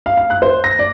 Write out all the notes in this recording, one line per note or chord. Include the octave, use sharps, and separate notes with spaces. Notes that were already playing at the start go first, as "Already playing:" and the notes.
F5
F5
F#6
C5
A#6
D5